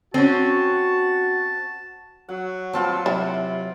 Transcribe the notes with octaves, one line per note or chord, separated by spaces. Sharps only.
C4 C#4 F#4 A5
F#3 F#5
G3 C4 F4 B4 G5 A5
C3 F#3 E4